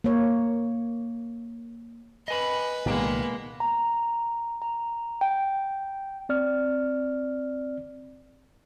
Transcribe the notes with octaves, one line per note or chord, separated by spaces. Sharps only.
A#3 C#5
B4 D#5 G#5 B5
C2 A#2 D#3 G#3 A#3 B3
A#5
A#5
G5
C4 D5 F6